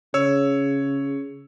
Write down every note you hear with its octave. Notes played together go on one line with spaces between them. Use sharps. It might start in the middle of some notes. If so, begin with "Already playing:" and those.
C#3 C#5 E6